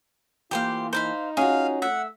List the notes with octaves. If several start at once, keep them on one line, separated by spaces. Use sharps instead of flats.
E3 A#3 F4 G4 C5 F5
D#4 C5 F5 B5
C#4 F4 F#4 G#4 F5
A3 E5 F#5